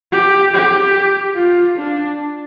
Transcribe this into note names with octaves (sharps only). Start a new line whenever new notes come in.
G4
G4
F4
D4